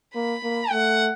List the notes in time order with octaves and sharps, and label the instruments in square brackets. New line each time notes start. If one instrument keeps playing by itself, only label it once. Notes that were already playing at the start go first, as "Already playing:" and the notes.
[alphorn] A#3 [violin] B5
[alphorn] A#3
[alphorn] A3 [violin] F#5